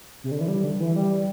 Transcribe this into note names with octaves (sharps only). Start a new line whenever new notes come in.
C3
D3
E3
G3
D3
E3
G3